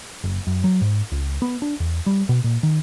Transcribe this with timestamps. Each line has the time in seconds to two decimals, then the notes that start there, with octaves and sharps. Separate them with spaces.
0.24 F#1
0.47 F#2
0.64 F#3
0.81 G#2
1.12 C#2
1.42 B3
1.62 D4
1.80 E2
2.06 G3
2.29 B2
2.44 A#2
2.63 D#3